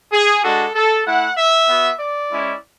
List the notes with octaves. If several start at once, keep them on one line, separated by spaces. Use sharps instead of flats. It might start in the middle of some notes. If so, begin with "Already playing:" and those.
G#4
G#3 D4 F#4 A4
A4
A3 E4 F#5
E5
B3 F#4
D5
G#3 C#4 E4